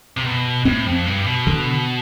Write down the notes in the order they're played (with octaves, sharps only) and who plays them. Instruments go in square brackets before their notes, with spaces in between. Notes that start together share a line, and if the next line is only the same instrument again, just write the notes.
[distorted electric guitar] C3
B2
[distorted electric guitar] A2 [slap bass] C4
[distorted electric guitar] F2
G2
B2
[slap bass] D3